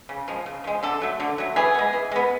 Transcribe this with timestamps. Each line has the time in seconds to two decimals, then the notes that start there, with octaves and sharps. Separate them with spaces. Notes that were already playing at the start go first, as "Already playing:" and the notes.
0.09 C#3
0.28 F3 G#3
0.46 C#3
0.64 F3 G#3
0.83 D3 A4
1.02 F#3 A3
1.20 D3
1.38 F#3 A3
1.56 E3 G#4
1.75 G#3 B3
1.93 E3
2.12 G#3 B3